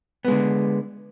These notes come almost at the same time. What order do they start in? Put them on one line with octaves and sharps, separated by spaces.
B3 G#3 D3